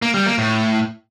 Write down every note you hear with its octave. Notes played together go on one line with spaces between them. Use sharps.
A#3
G3
A#3
A2